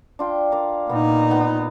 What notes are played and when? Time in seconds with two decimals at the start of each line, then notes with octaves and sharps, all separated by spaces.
0.19 D4 F4 G5
0.51 G#4 A#4 D5
0.89 A#2 B3 D#4
1.31 B3